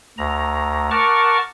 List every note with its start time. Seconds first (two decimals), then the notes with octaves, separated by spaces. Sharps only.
0.18 D2 A#5
0.91 A#4 F#5 A5 C#6 D6 F6